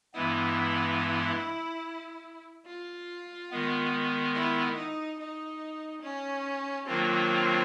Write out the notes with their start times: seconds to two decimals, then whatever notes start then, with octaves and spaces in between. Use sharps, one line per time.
0.14 G2 E3 G#3 B3 E4
2.66 F4
3.51 D#3 G#3 B3
4.34 E4
4.76 D#4
5.19 D#4
6.02 C#4
6.86 D#3 F#3 A#3 C4 D4 F4